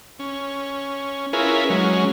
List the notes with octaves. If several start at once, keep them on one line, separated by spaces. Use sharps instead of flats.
C#4
C#4 E4 F4 G#4 A#4 B4
F#3 G#3 C#4